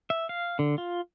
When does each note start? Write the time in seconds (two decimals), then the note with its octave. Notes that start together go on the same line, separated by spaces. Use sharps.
0.10 E5
0.29 F5
0.59 D3
0.78 F4